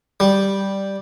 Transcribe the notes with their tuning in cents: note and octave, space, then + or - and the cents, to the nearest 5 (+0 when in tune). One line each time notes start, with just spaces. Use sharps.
G3 +0